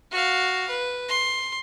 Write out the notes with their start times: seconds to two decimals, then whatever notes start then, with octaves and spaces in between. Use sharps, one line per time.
0.11 F#4 F5
0.70 B4
1.09 C6